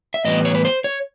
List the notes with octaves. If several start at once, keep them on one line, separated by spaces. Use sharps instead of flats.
E5
A2 E3 G3 B3 D#5
C#5
B4
C5
C#5